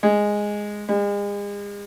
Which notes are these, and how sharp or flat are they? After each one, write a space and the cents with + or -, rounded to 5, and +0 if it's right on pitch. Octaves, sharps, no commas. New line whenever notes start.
G#3 -5
G#3 -40